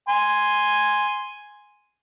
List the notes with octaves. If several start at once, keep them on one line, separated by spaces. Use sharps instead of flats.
G#5 C6